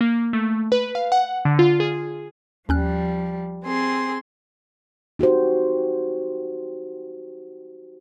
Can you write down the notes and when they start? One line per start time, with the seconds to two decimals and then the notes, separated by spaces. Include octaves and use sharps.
0.01 A#3
0.33 A3
0.72 B4
0.95 F5
1.12 F#5
1.45 D3
1.59 F4
1.80 G#4
2.69 D#2 F3 G3 C#4 F#6
3.65 C4 G#4 C6
5.19 D#4 F#4 G4 C5